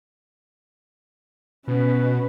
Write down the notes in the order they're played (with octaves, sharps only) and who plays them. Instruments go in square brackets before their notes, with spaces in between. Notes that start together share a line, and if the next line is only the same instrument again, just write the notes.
[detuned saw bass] B2 [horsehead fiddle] C#4 B4